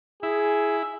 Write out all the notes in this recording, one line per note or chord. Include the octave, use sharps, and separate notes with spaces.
E4 G#4